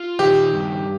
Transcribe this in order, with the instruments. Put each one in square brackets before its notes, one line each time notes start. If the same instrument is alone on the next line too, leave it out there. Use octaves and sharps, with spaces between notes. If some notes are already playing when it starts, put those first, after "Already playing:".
Already playing: [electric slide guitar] F4
[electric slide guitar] D#3 [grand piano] G4
[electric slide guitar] G2